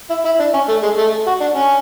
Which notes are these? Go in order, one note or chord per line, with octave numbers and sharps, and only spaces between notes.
E4
E4
D4
C#4
A3
G#3
A3
F#4
D4
C#4